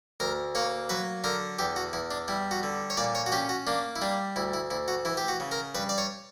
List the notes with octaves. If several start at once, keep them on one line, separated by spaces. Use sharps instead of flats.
D2 A#4
A#3 C#5
F#3 B4
D3 A#4
E2 G4
F#4
E2 E4
D4
G3 E4
F#4
D3
C#5
A#2 D5
C#5
F#4
C#4 G4
F#4
A#3 D4
E4
G3 D4
D2 E4
E4
D2 E4
F#4
E3 E4
G4
F#4
C#3
A#4
G2 B4
D5
C#5